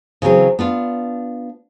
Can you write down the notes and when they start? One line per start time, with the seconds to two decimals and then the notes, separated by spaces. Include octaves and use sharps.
0.22 C#3 E3 F#3 C4 G#4
0.59 B3 D4 F4